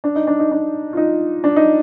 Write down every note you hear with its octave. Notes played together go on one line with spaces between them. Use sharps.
D4
D#4
D4
D#4
D4
F4
D#4
D4
D#4